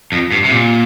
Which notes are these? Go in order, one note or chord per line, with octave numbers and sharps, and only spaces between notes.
F2
G2
C3
A#2